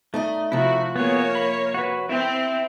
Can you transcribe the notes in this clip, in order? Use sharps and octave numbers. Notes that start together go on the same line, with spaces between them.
A3 D#4 D5 D#5
C3 F3 A3 E4 F#4
A#3 B3 G#4 C#5
B5
F#4 B4
C4 E4 E5 G5